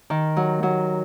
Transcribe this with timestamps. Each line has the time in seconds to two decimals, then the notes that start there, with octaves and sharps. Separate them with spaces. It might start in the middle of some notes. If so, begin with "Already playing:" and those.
0.10 D#3
0.37 F#3
0.63 F#3